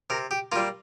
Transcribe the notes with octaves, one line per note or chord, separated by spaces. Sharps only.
C3 A#4
G4
G3 A#3 F4